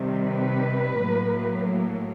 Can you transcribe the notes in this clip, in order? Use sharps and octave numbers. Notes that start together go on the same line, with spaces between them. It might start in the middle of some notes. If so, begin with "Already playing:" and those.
Already playing: C3 D#3 G3
B4
A2 F#3 A#3